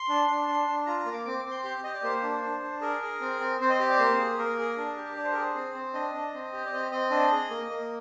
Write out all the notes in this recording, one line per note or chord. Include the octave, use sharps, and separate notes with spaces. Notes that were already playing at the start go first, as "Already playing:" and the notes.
Already playing: C6
D4
D4
D4
D4
F4 A#5
A#5
A#3
D6
C4 D6
D6
C4
C6
G4 C6
G4 D#5
D5
A#3 C5
D4
D4
D4
G#4 A#4
G#4
C4
C4
C4 C5
D#5
G4
D5
A#3 C5
G#4
A#3 A#4
G#4
D4
G4
D4 D5
C5
G#4 A#4
C5
C4
C4
D4 D#5
D4
C4
G4
D5
C4 D#5
C4 D#5
D4 D#5
G#4
A#3
A#3